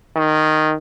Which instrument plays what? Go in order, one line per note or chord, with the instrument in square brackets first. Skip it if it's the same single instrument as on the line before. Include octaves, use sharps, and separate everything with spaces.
[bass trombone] D#3